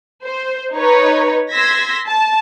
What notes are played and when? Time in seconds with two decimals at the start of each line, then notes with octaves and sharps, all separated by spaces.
0.23 C5
0.75 D#4 B4 C#5
1.51 C6 E6 G#6 A#6 B6
2.06 A5